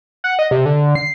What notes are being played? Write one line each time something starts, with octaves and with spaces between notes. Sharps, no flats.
F#5
D#5
C3
D3
C7